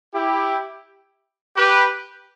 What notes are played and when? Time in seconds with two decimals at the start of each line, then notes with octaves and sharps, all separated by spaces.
0.14 E4 G4
1.56 G4 B4